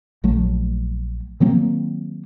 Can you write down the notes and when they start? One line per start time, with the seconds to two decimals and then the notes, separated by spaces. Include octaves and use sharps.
0.24 A#1 F#3 A3
1.40 D#3 F#3 A#3 C4